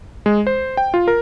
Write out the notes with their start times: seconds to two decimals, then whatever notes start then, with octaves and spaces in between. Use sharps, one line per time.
0.26 G#3
0.47 C5
0.77 G5
0.94 F4
1.08 A#4